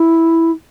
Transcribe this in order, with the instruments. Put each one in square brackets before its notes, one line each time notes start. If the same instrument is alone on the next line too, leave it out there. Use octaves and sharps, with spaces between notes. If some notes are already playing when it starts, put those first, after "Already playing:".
Already playing: [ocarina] E4